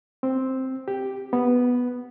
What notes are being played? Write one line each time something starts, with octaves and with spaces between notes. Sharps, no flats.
C4
G4
B3